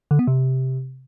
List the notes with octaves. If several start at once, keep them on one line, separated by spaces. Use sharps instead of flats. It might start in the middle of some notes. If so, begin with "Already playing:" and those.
D3
B3
C3